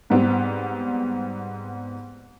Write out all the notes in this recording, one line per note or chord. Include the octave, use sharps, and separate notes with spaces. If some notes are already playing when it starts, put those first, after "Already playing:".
G#2 G3 B3 C4